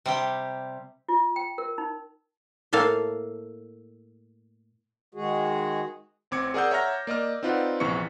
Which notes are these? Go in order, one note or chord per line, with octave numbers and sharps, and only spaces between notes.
C3 G3 G4
F4
G5
A#4
D#4
A2 A#3 A4 F5
D#3 G#3 F#4 G#4
A1 C4 D6 G#6 C#7
G#4 A#4 D5 F#5 E6 G6
C#5 E5 F#5 A#5 F6 A#6
A#3 D5 D#5 F6
C4 D#4 F4 B4 D5 F#5
A#1 E2 C3 E3 C#6 C#7